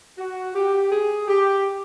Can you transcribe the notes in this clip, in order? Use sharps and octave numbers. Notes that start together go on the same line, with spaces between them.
F#4
G4
G#4
G4